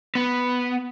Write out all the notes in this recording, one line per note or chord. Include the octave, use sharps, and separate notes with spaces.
B3